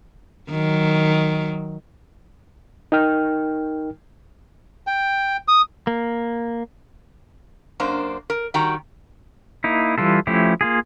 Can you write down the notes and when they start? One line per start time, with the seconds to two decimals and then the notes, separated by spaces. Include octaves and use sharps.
0.50 D#3 F#3
2.92 D#4 A#4 G5 F6
4.87 G5
5.48 D#6
5.87 A#3
7.80 F#2 A#3 D4 C5
8.30 A#4
8.54 D#3 G3 F#4 G5 A#5
9.64 A#3 D#4 E4
9.98 E3 G3 F4 A4
10.27 F3 A3 C#4 E4 G4
10.61 A#3 F4 G#4